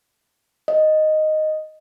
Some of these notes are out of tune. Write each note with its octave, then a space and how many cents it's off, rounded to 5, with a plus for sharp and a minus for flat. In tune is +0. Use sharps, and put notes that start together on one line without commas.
D#5 -5